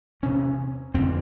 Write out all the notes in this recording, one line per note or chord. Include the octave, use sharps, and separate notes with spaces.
E2 C3 C#4
F2 D3 C4